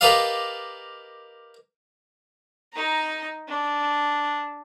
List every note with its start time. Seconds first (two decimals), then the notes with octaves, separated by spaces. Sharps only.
0.01 G4 A#4 B4 D5 D#5 F5
2.74 D#4 A#5
3.48 D4